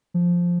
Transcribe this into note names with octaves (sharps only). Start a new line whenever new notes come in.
F3